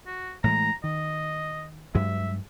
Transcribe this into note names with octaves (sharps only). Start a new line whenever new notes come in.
F#4
A2 E3 G#3 A#5
D#3 D#5
G2 F#3 G#3 E5